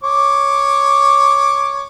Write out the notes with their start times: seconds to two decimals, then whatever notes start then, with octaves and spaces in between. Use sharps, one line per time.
0.03 C#5 D6